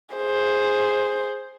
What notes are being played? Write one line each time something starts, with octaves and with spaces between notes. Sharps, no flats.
G#4 C5